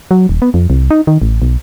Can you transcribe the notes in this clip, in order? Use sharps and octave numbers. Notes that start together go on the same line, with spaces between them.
F#3
D#1
B3
F2
C2
D#4
D#3
A1
B1